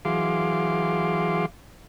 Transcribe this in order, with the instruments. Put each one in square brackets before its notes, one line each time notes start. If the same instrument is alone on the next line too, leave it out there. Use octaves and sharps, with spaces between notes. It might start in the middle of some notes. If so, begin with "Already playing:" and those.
[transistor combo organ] E3 F#3 G#4 F5 C6 D6